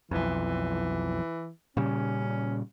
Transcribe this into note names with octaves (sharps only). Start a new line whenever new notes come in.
B1 F2 E3
A#2 C#3 G3 C#4